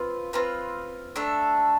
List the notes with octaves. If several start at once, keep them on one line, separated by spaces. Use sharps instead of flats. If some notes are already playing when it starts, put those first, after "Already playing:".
Already playing: C4 F4 B4
C4 F4 B4
A3 D4 A4